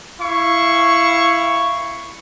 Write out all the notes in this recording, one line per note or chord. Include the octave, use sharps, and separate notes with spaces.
E4 F5 C#6